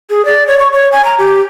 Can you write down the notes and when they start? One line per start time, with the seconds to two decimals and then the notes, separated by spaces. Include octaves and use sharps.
0.10 G#4
0.25 D5
0.47 C#5
0.60 C#6
0.73 C#5
0.92 G#5
1.05 A#5
1.18 G4